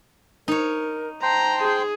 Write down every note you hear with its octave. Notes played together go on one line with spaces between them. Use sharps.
D#4 A#4 C#5
C5 G5 A5 A#5 C6
G#4